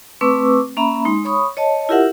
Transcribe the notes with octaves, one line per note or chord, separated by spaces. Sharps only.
A3 C4 B4 C#6 D6 E6
A#3 C#4 E5 A#5 B5
G#3 D#4 C6
C#5 B5 C#6 D#6
C#5 D#5 A5
E4 F4 G4 A#4 E5 F#5